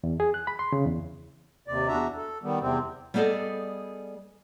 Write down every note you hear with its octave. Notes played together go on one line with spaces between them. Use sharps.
E2
G#4
F#6
B5
C6
C#3
E2
D#2 C3 D5
E2 D4 F#4 E5 A#5
A4
D#3 G3 B3
E2 C3 C4
G3 B3 G#4 A4 D5 D#5